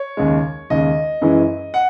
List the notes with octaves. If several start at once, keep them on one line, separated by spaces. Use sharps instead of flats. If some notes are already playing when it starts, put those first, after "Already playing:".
Already playing: C#5
D#2 C#3 G#3
D#2 C#3 G#3 D#5
F#2 E3 G#3 C#4
F#5